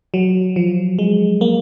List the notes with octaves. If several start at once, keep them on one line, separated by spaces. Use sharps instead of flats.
F#3
F3
G#3
A#3